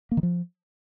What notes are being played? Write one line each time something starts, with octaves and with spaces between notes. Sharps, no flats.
A#3
D#3
F3